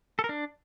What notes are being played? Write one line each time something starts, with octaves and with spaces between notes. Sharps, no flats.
A4
A#4
D4